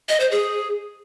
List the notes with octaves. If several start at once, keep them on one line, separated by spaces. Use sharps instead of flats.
D#5
C5
G#4